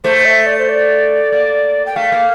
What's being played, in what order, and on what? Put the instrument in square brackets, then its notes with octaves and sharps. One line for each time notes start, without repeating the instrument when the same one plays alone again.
[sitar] A3 [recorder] C5
[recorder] E5
D5
C5
D5
[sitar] A#3
[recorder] G5
[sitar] A3 [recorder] F5
[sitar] A#3